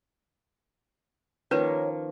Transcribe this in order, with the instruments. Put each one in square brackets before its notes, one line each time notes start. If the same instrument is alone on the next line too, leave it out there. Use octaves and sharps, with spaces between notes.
[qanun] D#3 F3 A#3 [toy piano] C#4 B4 [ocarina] C#5